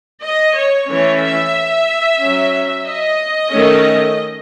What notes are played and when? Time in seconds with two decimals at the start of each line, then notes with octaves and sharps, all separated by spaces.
0.23 D#5
0.55 C#5
0.88 E3 A3 C#4 C#5
1.21 E5
2.20 F#3 C#4
2.85 D#5
3.51 D#3 A3 C#4